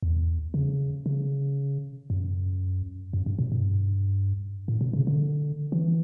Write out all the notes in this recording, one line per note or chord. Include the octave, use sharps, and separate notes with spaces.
E2
C#3
C#3
F#2
F#2
G2
B2
G2
A2
B2
C#3
D3
E3